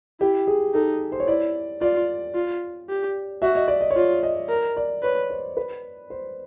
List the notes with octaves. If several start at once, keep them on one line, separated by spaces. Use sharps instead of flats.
E4 G4
G#4
D#4 A4
C5
C#5
E4 D5
F4 D5
F4
G4
F#4 E5
D#5
D5
D#5
C#5
F4 D5
D#5
A#4
D5
B4 C#5
C5
B4
C5